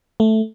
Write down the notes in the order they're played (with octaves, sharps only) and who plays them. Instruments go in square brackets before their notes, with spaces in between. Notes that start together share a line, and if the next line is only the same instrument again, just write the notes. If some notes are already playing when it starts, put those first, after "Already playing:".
[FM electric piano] A3